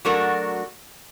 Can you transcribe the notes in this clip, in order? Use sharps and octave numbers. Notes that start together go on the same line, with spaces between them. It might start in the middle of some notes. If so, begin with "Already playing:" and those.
F#3 A3 D4 F#4 A#4